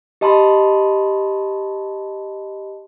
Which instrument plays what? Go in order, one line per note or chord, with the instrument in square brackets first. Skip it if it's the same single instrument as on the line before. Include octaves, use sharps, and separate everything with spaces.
[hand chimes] G4 D#5 A5 B5 C6